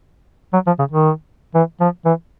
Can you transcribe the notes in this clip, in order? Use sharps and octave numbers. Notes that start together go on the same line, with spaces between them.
F#3
F3
C#3
D#3
E3
F3
E3